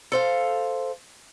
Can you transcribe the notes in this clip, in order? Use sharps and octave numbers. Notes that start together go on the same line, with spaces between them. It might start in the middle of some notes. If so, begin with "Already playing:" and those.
A4 C5 F5